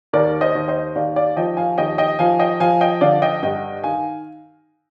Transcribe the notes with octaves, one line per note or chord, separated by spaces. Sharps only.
D#2 A#4 D5
C5 D#5
D#2
C5 D#5
D#2 D5 F5
D5 F5
F3 D#5 G5
F5 G#5
D#2 D#5 G5
D#5 G5
F3 F5 G#5
D#5 G5
F3 F5 G#5
D#5 G5
D3 D5 F5
D#5 G5
G2 D#5 G5
D#3 F5 G#5